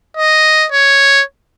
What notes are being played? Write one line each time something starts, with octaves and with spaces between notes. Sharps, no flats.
D#5
C#5